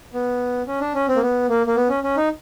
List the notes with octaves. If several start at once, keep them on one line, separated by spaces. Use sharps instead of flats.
B3
C#4
D4
C#4
C4
A#3
B3
A#3
A#3
B3
C#4
C#4
D#4